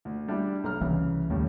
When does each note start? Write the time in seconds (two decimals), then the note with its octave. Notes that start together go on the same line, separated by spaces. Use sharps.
0.05 D2
0.28 G3 D4 E4
0.64 B1 A#5 F6
0.81 C2 C#3 E3
1.30 D#2 A2 C#3 G3